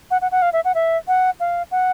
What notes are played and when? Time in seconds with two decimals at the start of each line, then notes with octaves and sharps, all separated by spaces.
0.11 F#5
0.21 F#5
0.31 F#5
0.42 F5
0.53 E5
0.64 F#5
0.75 E5
1.08 F#5
1.40 F5
1.71 F#5